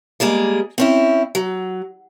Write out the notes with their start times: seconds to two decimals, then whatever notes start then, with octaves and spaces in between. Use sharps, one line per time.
0.20 G3 G#3 A#3 G#4
0.78 C4 C#4 E4
1.35 F#3